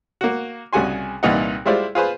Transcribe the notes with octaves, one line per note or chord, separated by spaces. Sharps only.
A#3 F#4
C2 C#3 F#4 G#5 C6
C2 A#2 E3 D#4 F#5
G3 G#3 E4 F4 C5 D5
F4 G#4 B4 C5